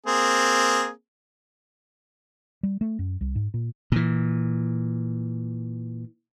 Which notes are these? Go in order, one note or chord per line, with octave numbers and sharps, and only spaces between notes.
A#3 C4 G#4
G3
A3
F#2
C2
G#2
A#2
A#2 E3